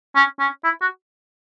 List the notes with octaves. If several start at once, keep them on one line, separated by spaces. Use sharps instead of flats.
C#4
C#4
E4
F#4